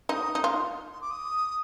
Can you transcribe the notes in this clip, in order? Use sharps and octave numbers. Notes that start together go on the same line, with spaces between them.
D#4 D#6
D#4
F4
C6
D6
D#6